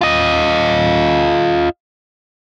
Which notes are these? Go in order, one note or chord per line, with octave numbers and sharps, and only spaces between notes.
F4 D#5